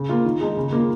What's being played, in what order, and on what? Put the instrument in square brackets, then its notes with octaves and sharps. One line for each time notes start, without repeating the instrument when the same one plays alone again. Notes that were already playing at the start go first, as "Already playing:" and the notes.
Already playing: [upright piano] C#3
A#3 F4
D#3
G#3 D#4
C#3
A#3 F4